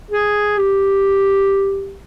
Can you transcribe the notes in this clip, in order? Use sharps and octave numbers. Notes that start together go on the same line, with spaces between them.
G#4
G4